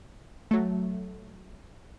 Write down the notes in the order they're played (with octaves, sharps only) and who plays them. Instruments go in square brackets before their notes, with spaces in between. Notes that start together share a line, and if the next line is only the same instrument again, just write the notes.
[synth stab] F#3 A3